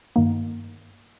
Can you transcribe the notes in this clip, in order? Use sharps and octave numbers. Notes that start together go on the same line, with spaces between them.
G2 D#3 A#3 D#4